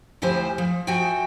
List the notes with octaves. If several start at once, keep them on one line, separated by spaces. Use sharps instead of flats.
D2 F3 E4 G4 C5 G#5
F3
F3 F#4 E5 G5 G#5